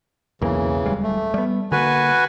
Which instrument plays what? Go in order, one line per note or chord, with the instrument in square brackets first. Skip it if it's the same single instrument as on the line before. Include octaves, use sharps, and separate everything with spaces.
[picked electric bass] B1 E2 A#3 [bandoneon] C#3 E3
[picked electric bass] D1 G3 G#3
[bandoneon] A3
[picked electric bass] G3 B3
[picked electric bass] D3 A#3 [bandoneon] F#4 B4 G#5